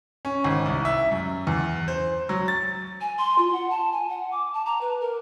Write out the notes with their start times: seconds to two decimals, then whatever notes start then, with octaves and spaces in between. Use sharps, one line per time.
0.25 C#4
0.44 G#1
0.66 C2
0.85 E5
1.12 F#2
1.47 E2
1.88 C5
2.29 F#3
2.48 A6
3.01 G#5
3.18 C6
3.38 F4
3.53 F#5
3.70 A5
3.92 G#5
4.09 F#5
4.32 D6
4.54 A5
4.66 A#5
4.81 B4
5.01 A#4